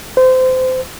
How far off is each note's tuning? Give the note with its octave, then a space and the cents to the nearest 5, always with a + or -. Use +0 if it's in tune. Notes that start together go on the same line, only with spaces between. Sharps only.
C5 -25